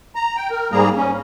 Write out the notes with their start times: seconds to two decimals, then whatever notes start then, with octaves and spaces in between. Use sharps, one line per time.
0.16 A#5
0.37 G5
0.51 A#4
0.72 G#2 G3 A#3 G#4 A#5
0.96 C#4